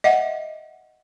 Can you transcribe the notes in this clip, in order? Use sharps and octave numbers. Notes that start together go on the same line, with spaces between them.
D#5 E5 F#5